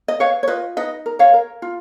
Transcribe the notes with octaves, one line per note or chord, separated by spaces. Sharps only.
D#5
B4 C#5 F5
C#5
F4 B4 D#5
D#4 B4 D#5
A#4
C#5 F5
A#4
F4